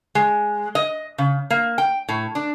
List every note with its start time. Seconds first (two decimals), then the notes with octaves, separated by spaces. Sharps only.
0.15 G#3
0.75 D#5
1.18 C#3
1.50 A#3
1.78 G5
2.09 A2
2.35 D4